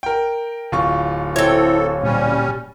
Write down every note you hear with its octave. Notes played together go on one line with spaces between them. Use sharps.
A#4 G5
D1 F4 C#6
C4 E4 A4 C#5
A#2 G3 C#4